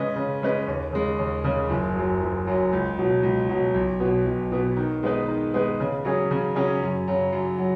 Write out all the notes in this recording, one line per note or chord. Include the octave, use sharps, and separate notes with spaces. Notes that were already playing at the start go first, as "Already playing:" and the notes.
Already playing: C#3 G#3 C#4 B4 D#5
C#3
G#3 C#4 B4 D#5
D#2
C#3 G#3
D#2
C#3 G#3
F#1
F#2 F#3
F#1
F#2 F#3
C#2
B2 F#3
C#2
B2 F#3
B1
B2 B3
B1
B2 B3
D#3
G#3 B3 D#4 B4
D#3
G#3 B3 D#4 B4
C#3
F#3 C#4 G#4
C#3
F#3 C#4 G#4
F#2
C#3 F#3
F#2
F#3